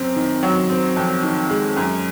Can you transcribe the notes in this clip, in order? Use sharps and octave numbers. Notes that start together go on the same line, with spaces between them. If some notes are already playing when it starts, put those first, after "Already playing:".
Already playing: F#2 C4
D#3
F#3
C4
F2
D#3
G#3
F#2